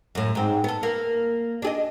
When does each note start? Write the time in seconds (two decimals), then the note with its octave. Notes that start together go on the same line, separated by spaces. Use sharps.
0.15 F#2 A2
0.35 G#2 C4
0.64 B3 A4
0.83 A#3
1.62 D4 G#4 D#5